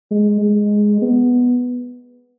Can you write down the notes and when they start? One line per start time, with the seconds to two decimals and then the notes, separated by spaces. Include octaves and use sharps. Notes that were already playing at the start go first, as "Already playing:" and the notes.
0.11 G#3
0.41 G#3
1.02 B3